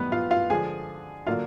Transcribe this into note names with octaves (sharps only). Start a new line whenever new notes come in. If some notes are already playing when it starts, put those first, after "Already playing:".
Already playing: F#2 D#3 G3 B3 B4
F4 F5
F4 F5
D3 F3 G#3 G#4 G#5
D3 F#3 A#3 D4 F4 F5